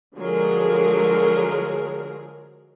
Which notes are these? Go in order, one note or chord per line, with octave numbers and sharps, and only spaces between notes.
D3 F3 F#3 G#3 G#4 A#4